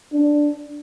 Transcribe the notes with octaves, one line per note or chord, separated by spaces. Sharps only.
D4